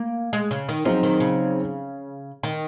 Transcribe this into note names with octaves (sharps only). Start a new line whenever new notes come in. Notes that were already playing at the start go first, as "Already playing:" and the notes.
Already playing: A#3
G#3
C#3
D#3
F3 F#3 C4 D#4 G#4
D#3
C#3
D#3